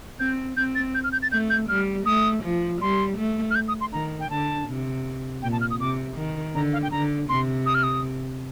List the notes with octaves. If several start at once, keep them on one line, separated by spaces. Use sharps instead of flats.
C4 G6
C4 G6
A6
G6
F6
G6
A6
A3 G6
G6
G3 F6
A3 D#6
F3
G3 C6
A3
F6
G6
D#6
C6
D#3 A#5
G5
D3 A5
C3
A#2 G5
A5
F6
D#6
C3 D6
D#3
D3 A#5
F5
G5
D3 A#5
C3 C6
D#6
F6
D#6